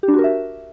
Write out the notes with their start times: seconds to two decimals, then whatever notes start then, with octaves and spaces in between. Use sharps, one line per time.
0.03 G4
0.08 D4
0.13 F#4
0.19 A#4
0.24 E5